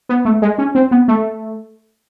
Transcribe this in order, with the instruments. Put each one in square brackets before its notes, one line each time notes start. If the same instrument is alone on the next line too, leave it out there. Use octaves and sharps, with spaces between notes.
[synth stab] B3
A3
G#3
C#4
C4
B3
A3